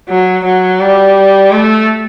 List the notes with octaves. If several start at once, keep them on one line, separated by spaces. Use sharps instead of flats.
F#3
F#3
G3
A3